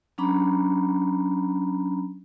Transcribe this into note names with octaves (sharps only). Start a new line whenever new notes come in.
F#3 C#4 D4 A#5 B5